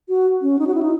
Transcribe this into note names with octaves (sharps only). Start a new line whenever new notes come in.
F#4
C#4
D#4
F#4
E4
D#4